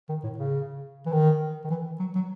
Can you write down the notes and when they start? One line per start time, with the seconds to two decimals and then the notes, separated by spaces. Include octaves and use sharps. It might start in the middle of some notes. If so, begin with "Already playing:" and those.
0.09 D#3
0.24 A2
0.38 C#3
1.06 E3
1.12 D#3
1.64 D#3
1.70 E3
1.99 F#3
2.15 F#3